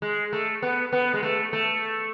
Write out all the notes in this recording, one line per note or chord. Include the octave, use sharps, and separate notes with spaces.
G#3
A3
B3
B3
G#3
A3
A3